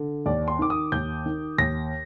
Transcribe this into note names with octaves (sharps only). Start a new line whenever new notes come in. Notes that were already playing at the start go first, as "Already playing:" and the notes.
Already playing: D3
D#2 D5
C6
D#3 D6
D#6
D#2 G6
D#3
D#2 A#6